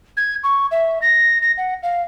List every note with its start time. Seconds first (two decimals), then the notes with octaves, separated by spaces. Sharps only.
0.17 G#6
0.44 C#6
0.71 E5
1.02 A#6
1.42 A#6
1.58 F#5
1.83 F5